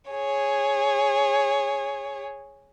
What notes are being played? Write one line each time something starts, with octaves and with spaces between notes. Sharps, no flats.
G#4 C#5